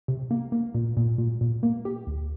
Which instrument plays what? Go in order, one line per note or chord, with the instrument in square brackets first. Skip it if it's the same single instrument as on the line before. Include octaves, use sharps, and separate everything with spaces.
[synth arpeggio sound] C3
A#3
A#3
A#2
A#2
A#2
A#2
A#3
G4
D2